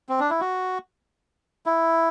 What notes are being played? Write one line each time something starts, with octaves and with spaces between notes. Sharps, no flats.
C4
D4
E4
F#4
E4